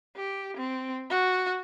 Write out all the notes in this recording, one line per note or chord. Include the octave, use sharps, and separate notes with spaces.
G4
C4
F#4